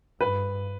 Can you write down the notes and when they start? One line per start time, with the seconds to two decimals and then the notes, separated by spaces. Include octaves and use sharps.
0.20 G2 B4